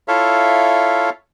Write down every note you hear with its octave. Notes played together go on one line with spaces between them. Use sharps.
E4 F4 A4 C#5 E5 F5